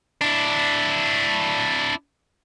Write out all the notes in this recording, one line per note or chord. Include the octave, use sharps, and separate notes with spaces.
D4 E4